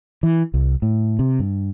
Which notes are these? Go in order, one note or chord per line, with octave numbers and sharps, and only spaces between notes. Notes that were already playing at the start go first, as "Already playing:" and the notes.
E3
C2
A2
C3
G2